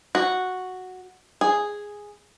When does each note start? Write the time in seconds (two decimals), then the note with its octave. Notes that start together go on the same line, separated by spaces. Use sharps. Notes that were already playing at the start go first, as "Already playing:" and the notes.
0.15 F#4
1.41 G#4